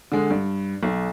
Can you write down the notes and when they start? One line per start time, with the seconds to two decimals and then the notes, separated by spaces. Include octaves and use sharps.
0.12 D3 G#3
0.30 G2
0.83 B1